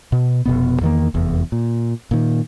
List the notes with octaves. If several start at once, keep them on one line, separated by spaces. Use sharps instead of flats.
B2
F1 B2 B3
E2 D#3 A#3
F1 E2
A#2
A#2 D#3